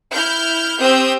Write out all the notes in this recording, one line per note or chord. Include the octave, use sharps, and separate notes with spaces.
E4 F6 G6
C4 G4 D#6 E6 G6